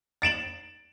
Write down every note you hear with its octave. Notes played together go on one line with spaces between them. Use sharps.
A6 D7 E7 F#7